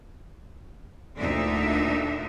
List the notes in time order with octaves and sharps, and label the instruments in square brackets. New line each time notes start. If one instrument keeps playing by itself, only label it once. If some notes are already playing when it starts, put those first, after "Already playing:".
[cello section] D2 A#2 D3 D4 D#4 E5